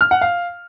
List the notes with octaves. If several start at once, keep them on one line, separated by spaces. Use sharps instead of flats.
F6
F#5
F5